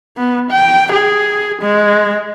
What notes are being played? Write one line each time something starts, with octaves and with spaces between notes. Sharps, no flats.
B3
G5
G#4
G#3